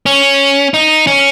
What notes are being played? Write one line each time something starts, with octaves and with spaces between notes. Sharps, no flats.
C#4
D#4
C#4